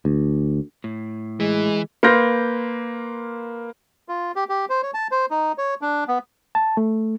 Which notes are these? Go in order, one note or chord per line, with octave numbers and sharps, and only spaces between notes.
D2
A2
E3 G#3
A#3 B4 C6 F6 G6 A#6
F4
G4
G4
C5
C#5
A5
C5
D#4
C#5
D4
B3
A5
A3